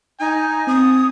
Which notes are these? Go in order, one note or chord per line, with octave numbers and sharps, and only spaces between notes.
D#4 G#5
C4 D#6